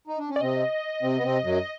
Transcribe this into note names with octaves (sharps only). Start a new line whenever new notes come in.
D#4
D4
C#4
D5
C3 C4 D#5
C3 C4
B3
C3 C4
F#2 F#3